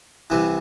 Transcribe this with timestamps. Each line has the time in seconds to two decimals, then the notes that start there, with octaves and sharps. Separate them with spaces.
0.30 C2 C3 E3